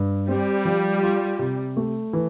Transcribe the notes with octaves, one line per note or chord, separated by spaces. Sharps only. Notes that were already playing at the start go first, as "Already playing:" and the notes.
Already playing: G2
G3 C4
F3
F4
C3
A3
E3